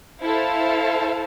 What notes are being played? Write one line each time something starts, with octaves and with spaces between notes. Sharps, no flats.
E4 A4 C5 F5